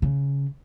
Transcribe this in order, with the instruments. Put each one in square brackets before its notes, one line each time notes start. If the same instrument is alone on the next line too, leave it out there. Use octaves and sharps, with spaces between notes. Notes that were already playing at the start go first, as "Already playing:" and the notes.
[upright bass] C#3